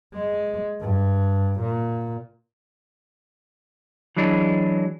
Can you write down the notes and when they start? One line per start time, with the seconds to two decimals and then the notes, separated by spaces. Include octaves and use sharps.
0.14 G#3
0.81 G2
1.60 A#2
4.17 E3 F#3 G#3 D4